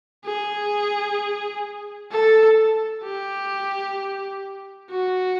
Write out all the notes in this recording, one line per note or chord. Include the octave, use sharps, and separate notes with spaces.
G#4
A4
G4
F#4